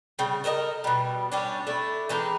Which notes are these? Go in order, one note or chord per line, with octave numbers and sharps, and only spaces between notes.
C#3 G3
A4 A#4 C#5 D#5
B2 G3
G3 C#4 D4
A3 D4 E4
E3 G#3 D#4 G4